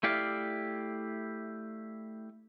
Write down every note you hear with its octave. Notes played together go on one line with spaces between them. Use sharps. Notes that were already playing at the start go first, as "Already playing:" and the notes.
A3 E4 G4 D5 F5